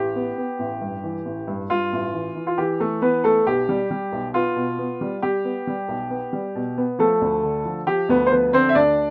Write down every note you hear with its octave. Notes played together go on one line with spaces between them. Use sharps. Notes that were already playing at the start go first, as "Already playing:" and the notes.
Already playing: A1 G4
B3
B3
A1
G2
E3
A1
G2
G2 F4
A1
E3
E3
F4
E3 G4
E3 A3 A4
E3 B3 B4
A3 B3 A4
B1 G4
G3
G3
B1
B3 F4
B2
B3
G3
G3 G4
B3
G3
B1
B3
G3
B2
B3
F3 A3 A4
D2
D3
F3
F3 G4
D2 B3 B4
C5
F3 B3 B4
D3 C4 C5
E5
D2 D4 D5